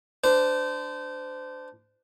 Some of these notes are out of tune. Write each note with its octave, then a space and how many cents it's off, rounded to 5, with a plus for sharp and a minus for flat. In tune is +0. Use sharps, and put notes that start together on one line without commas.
D4 +0 C5 -30